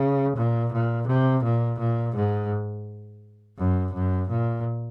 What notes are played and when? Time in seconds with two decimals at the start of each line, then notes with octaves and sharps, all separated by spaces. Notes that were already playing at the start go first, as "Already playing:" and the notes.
Already playing: C#3
0.36 A#2
0.72 A#2
1.07 C3
1.44 A#2
1.79 A#2
2.15 G#2
3.58 F#2
3.93 F#2
4.29 A#2